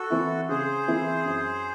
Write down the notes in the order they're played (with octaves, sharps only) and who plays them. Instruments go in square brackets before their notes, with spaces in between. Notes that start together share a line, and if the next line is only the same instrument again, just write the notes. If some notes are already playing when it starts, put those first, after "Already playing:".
Already playing: [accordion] F#4 A4
[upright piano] E3 C4 E4
[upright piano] C#3 [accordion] G#4 C5
[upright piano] E3 C4 E4
F#2